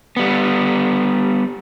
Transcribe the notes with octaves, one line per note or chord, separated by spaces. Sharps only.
G3 B3